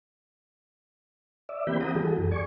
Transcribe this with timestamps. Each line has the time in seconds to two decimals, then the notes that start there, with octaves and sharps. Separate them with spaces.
1.49 D5 E5
1.67 E3 A#3 C4 G4 B5 G6
1.81 F#5 A#5 D#6
1.95 E3 G3 F#4 G#4 A4
2.18 F#2
2.31 D5 G#5 C#6